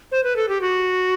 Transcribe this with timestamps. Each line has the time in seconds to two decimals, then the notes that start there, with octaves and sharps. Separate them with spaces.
0.12 C5
0.24 B4
0.36 A4
0.49 G4
0.62 F#4